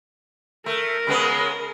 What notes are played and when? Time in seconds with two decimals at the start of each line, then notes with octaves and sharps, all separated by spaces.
0.66 A3 A#4
1.07 C#3 G#3 B3